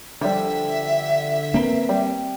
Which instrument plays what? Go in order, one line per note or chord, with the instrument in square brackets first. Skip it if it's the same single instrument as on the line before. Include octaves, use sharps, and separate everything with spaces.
[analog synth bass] D3 [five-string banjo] F3 G3 [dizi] E5
[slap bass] A#3 C4 [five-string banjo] A#4 B4
[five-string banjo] G3